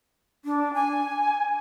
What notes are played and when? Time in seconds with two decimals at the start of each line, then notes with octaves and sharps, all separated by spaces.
0.45 D4
0.74 G#5